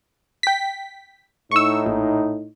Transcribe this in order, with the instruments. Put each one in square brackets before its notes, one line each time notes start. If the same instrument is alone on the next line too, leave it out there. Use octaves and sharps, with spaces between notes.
[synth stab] G5 B6
[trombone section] A2 D#4 [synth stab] C#6 E6
[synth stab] A#1